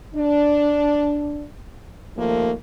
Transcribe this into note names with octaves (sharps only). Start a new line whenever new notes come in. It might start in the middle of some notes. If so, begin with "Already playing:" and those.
D4
D#2 F3 A3 A#3